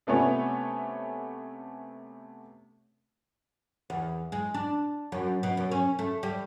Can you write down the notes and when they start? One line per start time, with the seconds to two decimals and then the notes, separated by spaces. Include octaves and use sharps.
0.07 C3 A3 B3 C#4
3.90 E2
4.32 G#3
4.54 D4
5.12 F#2
5.43 B2
5.57 F#2
5.71 C#4
5.99 A3
6.23 G3